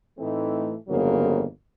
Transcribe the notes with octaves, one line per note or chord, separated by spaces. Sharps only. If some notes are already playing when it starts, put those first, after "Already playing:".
A2 E3 A3 C4 D#4
G1 F2 C#3 F#3 A#3